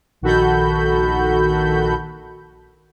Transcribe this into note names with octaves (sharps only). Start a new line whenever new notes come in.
A#1 D#3 F#4 A4 B5 G6